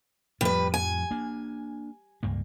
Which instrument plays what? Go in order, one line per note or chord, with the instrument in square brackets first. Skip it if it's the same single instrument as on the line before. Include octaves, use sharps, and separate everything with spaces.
[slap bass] F2 A2 F3 [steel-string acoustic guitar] G3 B4
[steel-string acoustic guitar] G#5
[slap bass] A#3 D4
C#2 G2 A#3